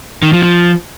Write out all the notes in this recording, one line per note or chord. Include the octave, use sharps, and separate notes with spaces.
D#3
F3
F3